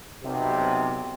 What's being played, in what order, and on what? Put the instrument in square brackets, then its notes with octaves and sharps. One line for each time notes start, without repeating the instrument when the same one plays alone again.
[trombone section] B1 C3